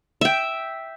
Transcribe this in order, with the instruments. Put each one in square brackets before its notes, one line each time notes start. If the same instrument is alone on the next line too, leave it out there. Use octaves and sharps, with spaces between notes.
[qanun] E5 G5